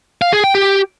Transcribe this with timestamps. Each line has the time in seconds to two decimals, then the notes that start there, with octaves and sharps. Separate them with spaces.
0.22 F5
0.33 G#4
0.44 G5
0.55 G4